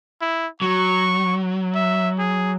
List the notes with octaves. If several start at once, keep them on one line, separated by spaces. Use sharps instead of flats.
E4
F#3 C#6
E5
G#4